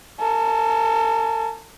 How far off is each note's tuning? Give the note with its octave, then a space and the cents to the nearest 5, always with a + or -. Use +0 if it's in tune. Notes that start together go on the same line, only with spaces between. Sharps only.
A#4 -45 A5 -35